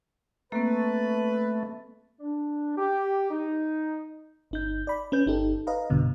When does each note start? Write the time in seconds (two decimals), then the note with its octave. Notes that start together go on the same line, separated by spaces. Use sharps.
0.52 A3 A#3 C4 B4
2.20 D4
2.77 G4
3.31 D#4
4.51 G1 D#4 G6
4.87 D5 B5
5.12 C#4 B4 G6
5.26 G1 D#4 G4 A4
5.67 B4 D#5 F5 A#5
5.90 A#1 G2 B2 D3